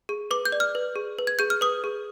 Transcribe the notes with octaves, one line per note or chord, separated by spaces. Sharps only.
G#4
B4 D6
G6
D5
F6
B4
G#4
B4
G#6
G#4 G6
F6
B4 D#6
G#4